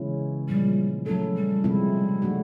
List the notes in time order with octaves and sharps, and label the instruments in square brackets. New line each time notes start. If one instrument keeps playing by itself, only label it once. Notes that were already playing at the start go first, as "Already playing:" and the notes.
Already playing: [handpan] C#3 E3 G#3 C#4 E4
[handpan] A#2 F3 G#3 [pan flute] G3
[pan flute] F#3 [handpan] A3 C#4 E4 A4
[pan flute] G3
[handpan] C3 F3 G#3 C4 E4
F#3 A3 D4 F#4